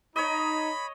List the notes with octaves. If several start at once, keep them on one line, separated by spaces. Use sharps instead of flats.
D#4 C#5 D#5 B5